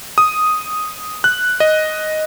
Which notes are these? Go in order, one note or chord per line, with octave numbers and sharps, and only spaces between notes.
D#6
F#6
D#5